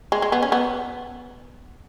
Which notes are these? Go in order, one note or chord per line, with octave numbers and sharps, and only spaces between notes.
G#3
G#3
B3
C#4
B3